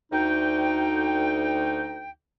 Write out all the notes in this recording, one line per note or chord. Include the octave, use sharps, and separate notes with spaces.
D2 D#4 G5